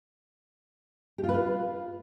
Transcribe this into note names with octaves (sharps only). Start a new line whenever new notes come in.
G4
F4
B4
F4